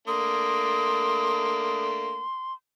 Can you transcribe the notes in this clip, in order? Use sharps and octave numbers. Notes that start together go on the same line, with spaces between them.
A3 A#3 D4 C6 D#6